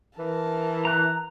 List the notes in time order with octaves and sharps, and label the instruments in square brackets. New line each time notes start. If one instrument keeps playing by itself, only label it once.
[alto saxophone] E3 [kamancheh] A#4 A5
[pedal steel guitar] A#5 F#6